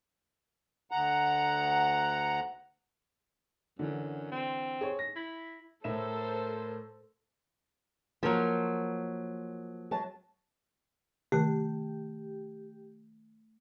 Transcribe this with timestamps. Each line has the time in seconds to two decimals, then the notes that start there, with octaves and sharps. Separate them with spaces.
0.91 D2 F#5 A#5
3.79 F#2 D3 E3
4.32 C4
4.81 G#4 C#5
4.99 A#6
5.16 E4
5.84 A2 A4 A#4 C5 E5 E7
8.23 F3 F#3 A#3 A#4
9.91 F#3 A5
11.32 C3 D#3 A3 G4 F#6